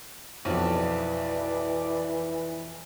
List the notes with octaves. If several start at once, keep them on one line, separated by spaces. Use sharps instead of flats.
B1 F2 E3 D5